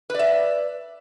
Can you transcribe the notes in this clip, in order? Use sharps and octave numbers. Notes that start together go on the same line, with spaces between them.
B4 D5 E5